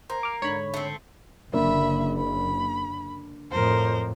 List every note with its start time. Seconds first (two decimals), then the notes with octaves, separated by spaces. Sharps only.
0.10 A#3 C5
0.23 D6 F6
0.42 G#2 D3 C#5 B5
0.74 A3 C4
1.53 F#1 D3 A#3 D4 E5 B5
2.18 B5
3.52 F2 A2 A#4 C5